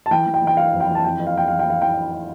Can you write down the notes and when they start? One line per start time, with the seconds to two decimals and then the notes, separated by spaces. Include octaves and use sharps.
0.06 A5
0.11 E3 G5
0.26 E3
0.34 G5
0.42 E3
0.47 G5
0.57 E3 F5
0.73 F2
0.80 G5
0.89 E3
0.95 A5
1.04 F2 G5
1.19 F2
1.27 F5
1.35 F2 G5
1.48 E3 F5
1.59 G5
1.66 E3 F5
1.81 E3 G5